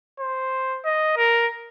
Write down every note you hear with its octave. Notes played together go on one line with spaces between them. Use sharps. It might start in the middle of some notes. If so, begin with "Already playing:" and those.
C5
D#5
A#4